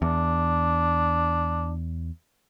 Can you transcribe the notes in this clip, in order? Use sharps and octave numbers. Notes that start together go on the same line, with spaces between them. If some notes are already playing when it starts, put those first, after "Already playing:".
E2 D4